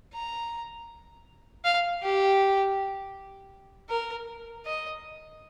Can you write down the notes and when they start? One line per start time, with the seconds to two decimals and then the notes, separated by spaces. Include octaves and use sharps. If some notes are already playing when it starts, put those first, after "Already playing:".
0.14 A#5
1.65 F5
2.03 G4
3.89 A#4
4.65 D#5